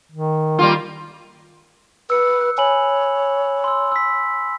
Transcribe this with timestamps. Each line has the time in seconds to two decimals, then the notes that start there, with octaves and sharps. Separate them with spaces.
0.12 D#3
0.59 G3 A#3 F4
2.10 B4 E6 C#7
2.41 F#6
2.58 C#5 G#5 B5 F#7
3.64 C6 E6
3.92 E6 B6